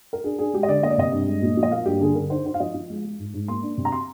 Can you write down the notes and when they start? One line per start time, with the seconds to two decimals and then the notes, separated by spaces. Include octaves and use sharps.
0.13 A#4
0.24 D4 G#4
0.39 D4 G#4
0.53 G#3 G4
0.63 D#5
0.68 D3 D5
0.83 A#3 D#5
0.90 D5
0.98 C3 D#5
1.12 G2
1.27 G#3
1.42 A#2
1.57 F3
1.63 D#5
1.72 A#3 F5
1.86 G2 G4
2.01 D3 G#4
2.15 D3 A#4
2.30 D#4 C5
2.45 D#4 C5
2.54 F5
2.60 F3 D#5
2.74 F3
2.90 G#3
3.05 G#3
3.19 G#2
3.34 G#2
3.48 A#3 C6
3.62 D4
3.78 C3
3.85 A#5
3.92 C6